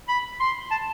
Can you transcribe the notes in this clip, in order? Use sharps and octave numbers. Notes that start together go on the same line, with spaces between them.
B5
C6
A5